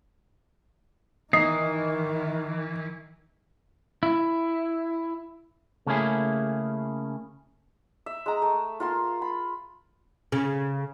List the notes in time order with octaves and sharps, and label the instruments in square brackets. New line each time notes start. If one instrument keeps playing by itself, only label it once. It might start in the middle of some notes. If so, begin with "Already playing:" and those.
[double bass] D#3 [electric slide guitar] E3 [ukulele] D#4 [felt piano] D#6 C7
[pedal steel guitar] E4
[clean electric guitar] C#3 A3 A#3 C#4 E4 G#4
[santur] E5
G#3 A#5
A3
F4 A#4 C6
B5
[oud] C#3